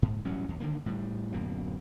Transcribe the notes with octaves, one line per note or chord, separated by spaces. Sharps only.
G#2
A1 F#3 G3 C#4
D#2
D3 D#3 A#3
A2 G3
D1 F#2 B2 A#3